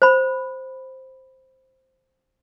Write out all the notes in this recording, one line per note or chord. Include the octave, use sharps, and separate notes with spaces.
C5 B5